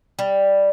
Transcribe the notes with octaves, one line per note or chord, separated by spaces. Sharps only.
G3